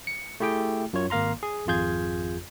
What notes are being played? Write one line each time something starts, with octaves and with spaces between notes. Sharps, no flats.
C#7
A3 E4 G4 G#4 G5
F#2 F4 C#5
G#1 A#3 F5 A#5 C6
G#4
G#1 F2 F4 G#4 G6 G#6